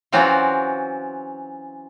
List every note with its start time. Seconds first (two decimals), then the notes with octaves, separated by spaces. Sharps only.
0.12 E3 F#3 C4 C#4 F4 F#4